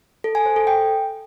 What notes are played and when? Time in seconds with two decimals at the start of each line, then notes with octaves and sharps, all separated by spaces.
0.24 A4
0.35 G#5
0.46 C5
0.56 A4
0.67 G5